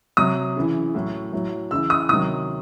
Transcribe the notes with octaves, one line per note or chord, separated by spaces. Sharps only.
C3 F#3 D#6
C#3 E3
A2 F#3
A2 F#3
C#3 E3 E6
D#6
C3 D#3 F#3 D#6